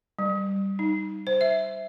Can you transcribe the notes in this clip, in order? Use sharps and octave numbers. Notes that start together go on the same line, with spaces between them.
G3
D#4
C5
E5